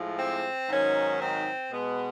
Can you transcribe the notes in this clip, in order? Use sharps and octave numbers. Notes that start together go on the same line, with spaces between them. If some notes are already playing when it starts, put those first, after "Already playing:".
Already playing: A2 F3 G#3
C4
G#2 D#3 F#3 C#4
C4
B2 G#3 B3